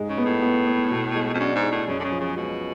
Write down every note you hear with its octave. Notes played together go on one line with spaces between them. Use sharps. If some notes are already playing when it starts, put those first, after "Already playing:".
Already playing: G#2 G#3
C#3
B3
A2
B3
B3
B2
G#3
F2
F#2 D4
G#2
G#3
A2
F#2 C#3
D3
C#3
F3
C#3
B2 G#3